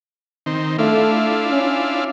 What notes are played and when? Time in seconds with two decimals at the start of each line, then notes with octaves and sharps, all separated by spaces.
0.46 D#3 C4
0.78 A3 D4 E4 F4
1.50 C#4